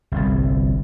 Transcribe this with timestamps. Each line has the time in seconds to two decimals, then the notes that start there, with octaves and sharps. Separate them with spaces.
0.12 G1 C2